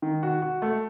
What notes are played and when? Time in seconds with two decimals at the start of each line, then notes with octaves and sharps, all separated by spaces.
0.02 D#3
0.23 F#4
0.42 F#4
0.62 A3